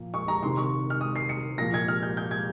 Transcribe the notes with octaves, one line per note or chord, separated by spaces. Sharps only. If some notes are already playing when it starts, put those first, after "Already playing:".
Already playing: A#2 F3
C#6
A#5
C3 D#3 C6
C#6
F6
D#6
C7
C#7
A#2 F3 A#6
G#6
F6
G6
G6
G#6